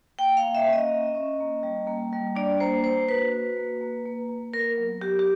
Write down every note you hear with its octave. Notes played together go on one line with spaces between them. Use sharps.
A#3 G5
F5
A#3
E5
C#4
D#5
C#4
C#4
A#3
G3
A#3
G3
D4 D5
A#3 C5
A#3 C5
F#4 B4
F#4
A#3
A#3
A#3
A#3
B3 A#4
F#3
F#3 G4
G4